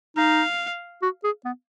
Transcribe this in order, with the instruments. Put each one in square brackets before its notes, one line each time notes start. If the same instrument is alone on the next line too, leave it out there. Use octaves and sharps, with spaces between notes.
[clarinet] D#4 [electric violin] F5
[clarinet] F#4
G#4
B3